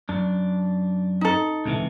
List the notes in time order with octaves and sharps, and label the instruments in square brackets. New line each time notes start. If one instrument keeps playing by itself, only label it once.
[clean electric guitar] F#2 D4
[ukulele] D#4 A4
[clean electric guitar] C#2 C3 E3